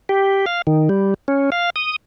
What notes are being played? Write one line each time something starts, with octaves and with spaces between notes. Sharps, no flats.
G4
F5
D#3
G3
C#4
F5
D#6